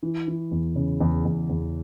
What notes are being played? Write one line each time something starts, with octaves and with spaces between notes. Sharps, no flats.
E3
E3
E2
C#3
E2
E2
E2